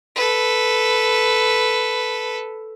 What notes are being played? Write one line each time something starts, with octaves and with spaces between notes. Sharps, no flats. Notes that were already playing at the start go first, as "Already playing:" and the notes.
A4 B4